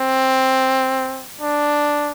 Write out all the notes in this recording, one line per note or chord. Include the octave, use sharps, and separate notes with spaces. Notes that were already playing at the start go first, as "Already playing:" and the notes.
Already playing: C4
D4